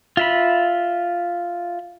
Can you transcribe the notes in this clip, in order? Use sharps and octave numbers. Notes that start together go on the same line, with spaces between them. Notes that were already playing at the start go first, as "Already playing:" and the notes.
F4 E5 B5